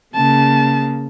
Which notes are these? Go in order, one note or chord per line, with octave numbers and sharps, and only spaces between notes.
C#3 A#3 A5